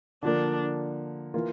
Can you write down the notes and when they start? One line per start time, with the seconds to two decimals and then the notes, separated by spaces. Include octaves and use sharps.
0.23 D3 F3 A#3 D4
1.34 E3 A#3 F4